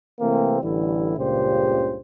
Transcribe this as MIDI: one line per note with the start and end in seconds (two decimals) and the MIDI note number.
0.21 0.59 48
0.21 0.59 52
0.21 0.59 57
0.21 0.59 58
0.21 0.59 60
0.62 1.15 33
0.62 1.15 50
0.62 1.15 52
0.62 1.15 55
0.62 1.15 64
1.18 2.00 37
1.18 2.00 43
1.18 2.00 46
1.18 2.00 49
1.18 2.00 67
1.18 2.00 72